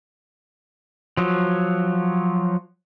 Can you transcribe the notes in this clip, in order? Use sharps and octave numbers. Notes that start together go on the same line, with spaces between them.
F3 F#3